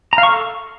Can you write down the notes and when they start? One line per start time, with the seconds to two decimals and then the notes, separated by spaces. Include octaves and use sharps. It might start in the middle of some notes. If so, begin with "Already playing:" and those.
0.13 A#5
0.18 F5
0.23 C#6
0.29 A4